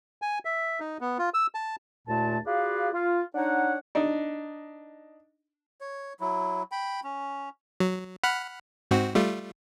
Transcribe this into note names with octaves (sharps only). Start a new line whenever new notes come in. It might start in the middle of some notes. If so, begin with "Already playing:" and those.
G#5
E5
D#4
B3
F4
E6
A5
D#2 A#2 A3 A5
F4 F#4 G#4 B4 D5 F5
F4
D4 D#4 C#5 F#5
D4 D#4
C#5
F#3 E4
G5 B5
C#4
F#3
F#5 B5 F6
G#2 C4 F#4
G3 A3 F4